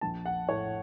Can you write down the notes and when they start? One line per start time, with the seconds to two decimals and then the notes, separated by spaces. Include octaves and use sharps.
0.01 A#1 A5
0.26 F#5
0.48 A2 A3 C#5